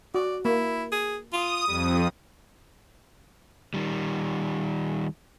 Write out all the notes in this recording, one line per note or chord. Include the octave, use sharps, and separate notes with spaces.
F#4 D5
A#3 E4
G#4
F4 D#6
F2 G3
D#3 G3